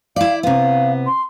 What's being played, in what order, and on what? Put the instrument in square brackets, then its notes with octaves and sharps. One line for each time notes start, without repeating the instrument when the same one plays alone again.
[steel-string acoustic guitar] E4 D5 [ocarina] F5
[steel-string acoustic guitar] C3 B3 [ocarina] F5
[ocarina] C6